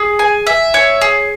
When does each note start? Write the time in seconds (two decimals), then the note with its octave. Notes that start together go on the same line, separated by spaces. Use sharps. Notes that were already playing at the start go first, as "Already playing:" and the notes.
Already playing: G#4
0.19 G#5
0.47 E5
0.74 C#5
1.01 G#4